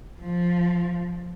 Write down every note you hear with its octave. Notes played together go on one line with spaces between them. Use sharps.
F3